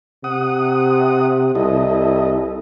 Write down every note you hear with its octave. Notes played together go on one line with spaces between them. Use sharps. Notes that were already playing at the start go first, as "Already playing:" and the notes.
C3 F#5 D#6
C2 E4 A4 D#5